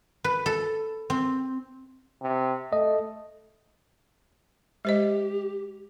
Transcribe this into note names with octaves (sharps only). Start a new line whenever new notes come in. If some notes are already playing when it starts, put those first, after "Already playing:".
B4
A4
C4
C3
A3 D#5
G#3 G4 C5 D#5